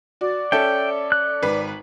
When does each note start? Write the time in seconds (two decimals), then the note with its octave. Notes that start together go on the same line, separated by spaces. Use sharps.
0.21 F#4 D5
0.52 C#4 A4 E5 G5
1.12 F#6
1.42 G#1 B4 B6